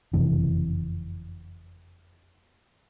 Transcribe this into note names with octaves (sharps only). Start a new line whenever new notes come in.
F#1 F2 C3 E3